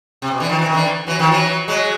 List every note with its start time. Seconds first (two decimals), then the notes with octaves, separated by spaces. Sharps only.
0.22 C3
0.31 B2
0.40 D3 E3
0.49 D#3 F3
0.59 E3
0.66 D#3
0.74 D3 E3
1.07 E3 F#3
1.19 D#3 F3
1.31 E3 F#3
1.68 F#3 G#3